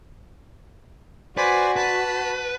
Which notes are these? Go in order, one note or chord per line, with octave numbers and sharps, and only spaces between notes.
F#4 B4 C5 D5 G#5
B4 A5